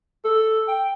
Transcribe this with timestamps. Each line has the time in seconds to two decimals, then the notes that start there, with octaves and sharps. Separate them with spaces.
0.25 A4
0.68 G5